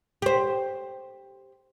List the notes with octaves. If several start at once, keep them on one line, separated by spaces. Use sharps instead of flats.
G4 C5